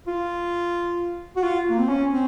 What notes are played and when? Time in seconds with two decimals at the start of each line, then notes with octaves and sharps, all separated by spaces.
0.07 F4
1.36 F#4
1.43 F4
1.70 A#3
1.79 C4
1.88 C#4
2.12 C4